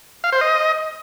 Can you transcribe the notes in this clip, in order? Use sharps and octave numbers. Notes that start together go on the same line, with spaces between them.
F5
C5
D#5